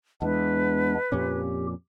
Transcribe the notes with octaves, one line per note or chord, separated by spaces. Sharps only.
E2 G#3 B3 D4 B4
F2 A#2 C#4 G4